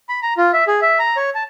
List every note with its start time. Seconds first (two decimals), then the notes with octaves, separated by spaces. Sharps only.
0.09 B5
0.23 A#5
0.37 F4
0.53 E5
0.67 G#4
0.82 E5
0.99 A#5
1.17 C#5
1.35 A5